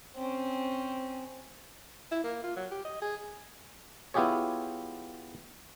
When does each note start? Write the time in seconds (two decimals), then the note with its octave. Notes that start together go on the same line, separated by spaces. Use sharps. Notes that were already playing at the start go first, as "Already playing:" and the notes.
0.16 C4 C#4
2.11 E4
2.24 A#3
2.43 F4
2.56 F#3
2.71 G4
2.85 D#5
3.02 G#4
4.14 B3 E4 F4 G4 G#4 C#5